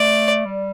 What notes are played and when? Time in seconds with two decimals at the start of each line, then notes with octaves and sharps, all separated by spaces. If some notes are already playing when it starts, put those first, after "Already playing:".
Already playing: A3 D5
0.45 G3